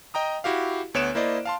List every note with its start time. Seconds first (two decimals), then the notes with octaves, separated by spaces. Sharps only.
0.14 D#5 G5 A#5 D#6
0.44 E4 F#4 G4 F5
0.94 D2 B3 C#5 F#6 D7 E7
1.15 A#3 E4 C5 D5 D#5
1.45 F5 A5 C6